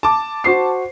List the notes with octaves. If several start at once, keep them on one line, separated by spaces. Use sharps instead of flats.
A5 D6
F#4 C5 C7